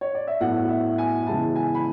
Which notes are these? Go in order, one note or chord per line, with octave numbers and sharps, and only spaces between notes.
C#5
D5
E5
A2 F#3 B3 F#5
E5
G#5
C#3 E3 G#3 B3 E4 A5
G#5
B5